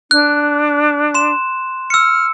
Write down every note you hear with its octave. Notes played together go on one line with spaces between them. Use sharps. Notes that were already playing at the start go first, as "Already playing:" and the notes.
D4 F#6
C6 E7
E6 F6 C#7